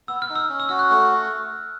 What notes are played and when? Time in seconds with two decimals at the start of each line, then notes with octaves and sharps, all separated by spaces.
0.08 B3 E6
0.22 F6
0.29 D#4
0.35 E6
0.49 C#4
0.60 E6
0.69 F#4 F6
0.79 F#6
0.90 A3